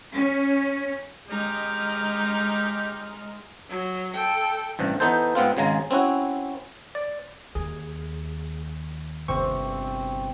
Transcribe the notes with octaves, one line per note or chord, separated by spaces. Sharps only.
C#4
G#3 D#4 G4 F6
F#3
A4 G5
A1 G2 C3
E3 B3 D#4 A4 C5
G#2 B3 C4 F4
G#1 C#3 G#3 A#5
C4 C#4 E4 F#4
D5
D#2 G#4
G1 C3 C4 C#6